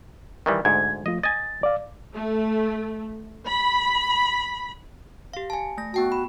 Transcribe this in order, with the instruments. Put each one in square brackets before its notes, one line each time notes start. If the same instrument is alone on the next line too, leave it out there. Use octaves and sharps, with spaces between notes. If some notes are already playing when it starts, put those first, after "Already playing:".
[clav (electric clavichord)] D#3 E3 G3
[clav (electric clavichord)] D2 G#2 [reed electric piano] G#6
[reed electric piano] F3 A3 F4 [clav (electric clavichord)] D#5
[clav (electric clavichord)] D#5 G#5 [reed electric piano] A6
[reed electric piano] D5 F5
[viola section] A3
B5
[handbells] G4 F5
G#5 A5
A3 A#6
[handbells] B3 G5 A5 [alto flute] F#4
[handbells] B5